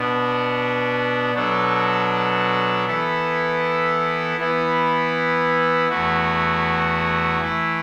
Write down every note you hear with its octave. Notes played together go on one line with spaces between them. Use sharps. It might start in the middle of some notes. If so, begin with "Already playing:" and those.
Already playing: B2 B3 D4
B2 F#3 D4 A4
E3 B3 E4 A4
E3 B3 E4
E2 E3 A3 F#4
E3 A3 E4